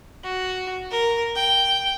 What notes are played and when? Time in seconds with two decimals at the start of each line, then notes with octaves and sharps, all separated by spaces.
0.24 F#4
0.91 A#4
1.36 G5